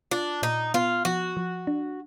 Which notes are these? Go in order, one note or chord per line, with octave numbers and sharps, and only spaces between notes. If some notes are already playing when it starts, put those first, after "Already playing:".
D4 F4
A#2 D#4
B3 F4
F3 F#4
F3
D4